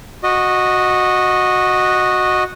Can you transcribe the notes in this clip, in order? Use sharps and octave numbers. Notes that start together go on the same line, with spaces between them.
F#4 D#5